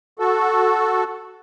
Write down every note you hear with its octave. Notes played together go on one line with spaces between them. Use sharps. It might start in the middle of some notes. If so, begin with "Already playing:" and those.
F#4 A4